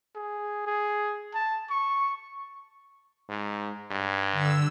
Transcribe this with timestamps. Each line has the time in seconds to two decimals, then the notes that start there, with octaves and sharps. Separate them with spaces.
0.15 G#4
0.67 G#4
1.34 A5
1.70 C#6
3.29 G#2
3.91 G2
4.32 D3 E6